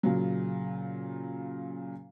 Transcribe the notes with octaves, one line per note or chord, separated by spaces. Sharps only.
A#2 C#3 F#3